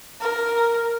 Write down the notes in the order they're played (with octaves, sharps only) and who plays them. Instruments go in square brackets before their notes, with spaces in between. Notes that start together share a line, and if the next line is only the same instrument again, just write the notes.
[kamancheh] A#4